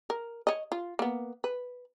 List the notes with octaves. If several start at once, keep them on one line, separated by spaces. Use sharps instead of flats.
A#4
C#5 D#5
F4
A#3 B3
B4